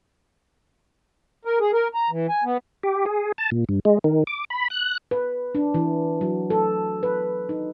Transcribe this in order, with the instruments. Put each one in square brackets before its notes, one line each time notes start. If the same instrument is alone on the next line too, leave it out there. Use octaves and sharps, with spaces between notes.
[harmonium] A#4
G#4
A#4
A#5
E3
G#5
B3
[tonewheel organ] G4
G#4
A5
A#2
G2
G#3
D#3
D6
B5
F#6
[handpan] B4
D4
E3
F#3
A4
B4
D#4